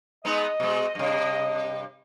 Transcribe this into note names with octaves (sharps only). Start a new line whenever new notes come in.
G#3 B3 D#4 D#5
B2 G#3
G2 C3